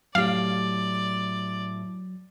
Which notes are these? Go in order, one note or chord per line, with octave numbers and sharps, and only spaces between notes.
A2 F#3 G4 D5 F5